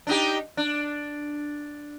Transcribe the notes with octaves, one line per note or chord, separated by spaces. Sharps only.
D4 D#4 G4
D4